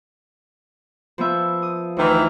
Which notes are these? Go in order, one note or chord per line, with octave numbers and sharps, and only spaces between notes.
F3 B3 E5
D#6
D2 D#3 E3